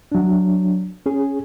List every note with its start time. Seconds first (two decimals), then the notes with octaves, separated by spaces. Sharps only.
0.12 F#3 D4
1.06 C#4 G#4